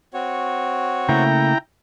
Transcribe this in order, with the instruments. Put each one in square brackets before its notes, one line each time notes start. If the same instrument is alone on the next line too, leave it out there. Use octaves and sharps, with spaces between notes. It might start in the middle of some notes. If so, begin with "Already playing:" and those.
[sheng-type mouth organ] C4 F#4 C#5
[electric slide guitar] C#3 A3 A#3 [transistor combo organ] E4 G5 A#5